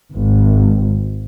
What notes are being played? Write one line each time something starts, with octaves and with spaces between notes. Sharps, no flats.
G#1